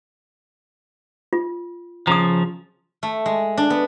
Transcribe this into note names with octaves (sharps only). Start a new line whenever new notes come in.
F4
C#3 F3 A#5 D#6
A3
G#3
D4
B3